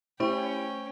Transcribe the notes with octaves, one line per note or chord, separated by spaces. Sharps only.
A3 C#4 E4 G4 C5 G5 C#6